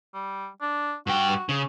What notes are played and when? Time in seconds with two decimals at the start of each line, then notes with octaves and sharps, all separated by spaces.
0.14 G3
0.61 D4
1.07 G2 F#4 G5
1.49 C#3